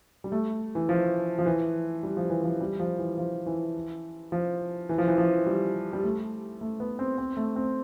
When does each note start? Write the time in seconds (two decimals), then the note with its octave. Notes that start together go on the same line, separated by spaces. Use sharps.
0.24 G3
0.32 A3
0.75 E3
0.89 F3
1.39 F3
1.46 E3
2.03 G3
2.17 F3
2.30 E3
2.43 F3
2.61 G3
2.80 F3
2.99 E3
3.18 F3
3.46 E3
4.32 F3
4.89 E3
4.98 F3
5.08 E3
5.18 F3
5.46 G3
5.93 G3
6.04 A3
6.61 A3
6.80 B3
6.99 C4
7.18 C4
7.37 A3
7.56 C4